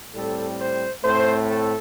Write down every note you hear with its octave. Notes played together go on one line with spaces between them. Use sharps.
A2 G3 C4 A4
C5
A2 A3 C4 C5
A4